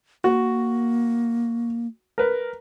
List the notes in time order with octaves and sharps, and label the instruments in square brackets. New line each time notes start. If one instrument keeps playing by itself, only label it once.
[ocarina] A#3 [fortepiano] F#4
[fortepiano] A#4 B4